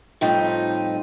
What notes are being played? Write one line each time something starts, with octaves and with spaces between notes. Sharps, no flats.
A2 F3 G3 C4 D#4